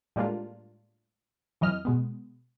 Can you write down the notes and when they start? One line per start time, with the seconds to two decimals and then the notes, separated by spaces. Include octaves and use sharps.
0.16 A2 G3 G#3 A#3 D4 F4
1.61 F2 E3 F#3 D#5 F6
1.85 B2 G#3 B3